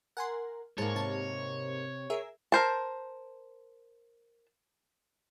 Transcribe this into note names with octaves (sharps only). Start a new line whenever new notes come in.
A#4 F#5 G#5 C6
G#2 A#3 G#4 C#5 A5
C3 A5
G#4 A#4 E5
A#4 C5 A5